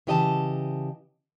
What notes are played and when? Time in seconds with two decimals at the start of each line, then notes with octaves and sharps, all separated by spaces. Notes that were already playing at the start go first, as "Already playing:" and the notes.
0.07 C#3 E3 G4 D#5 G#5 A5